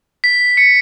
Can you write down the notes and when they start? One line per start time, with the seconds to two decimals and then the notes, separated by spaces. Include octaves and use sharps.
0.24 B6
0.57 C#7